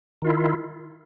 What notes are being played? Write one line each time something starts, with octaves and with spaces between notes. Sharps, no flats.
D#3 E4 F4